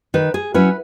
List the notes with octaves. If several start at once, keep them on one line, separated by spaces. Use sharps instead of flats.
D#3 B4
G#4
F#3 C#4 E4 B4